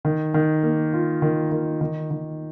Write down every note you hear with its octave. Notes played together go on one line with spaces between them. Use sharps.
D#3
D#3
A#3
F4
D#3
D#3
D#3
D#3